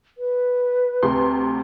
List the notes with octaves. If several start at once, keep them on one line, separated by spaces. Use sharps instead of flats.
B4
D2 C3 C6